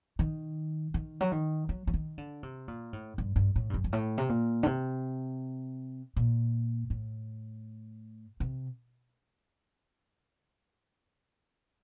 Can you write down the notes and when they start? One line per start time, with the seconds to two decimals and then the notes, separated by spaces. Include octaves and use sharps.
0.19 D#3
0.94 D#3
1.21 F#3
1.32 D#3
1.69 F#3
1.87 F#3
1.94 D#3
2.18 D3
2.43 C3
2.68 A#2
2.93 A2
3.18 G2
3.36 G2
3.56 A2
3.70 G2
3.74 F#2
3.84 G2
3.93 A2
4.18 C3
4.29 A#2
4.63 D3
4.66 C3
6.16 A#2
6.90 A2
8.40 C3